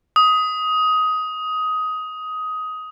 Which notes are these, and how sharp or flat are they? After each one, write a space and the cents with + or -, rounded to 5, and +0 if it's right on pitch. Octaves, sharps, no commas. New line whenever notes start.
D#6 +15